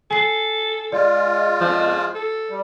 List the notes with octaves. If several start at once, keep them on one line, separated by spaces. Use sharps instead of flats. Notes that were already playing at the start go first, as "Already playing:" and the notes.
A4 G#5 C7
G#3 F4 D5
F3
A4
G3